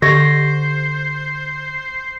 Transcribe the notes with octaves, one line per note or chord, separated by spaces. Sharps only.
D3 G4 C5 D#5 C#6 A#6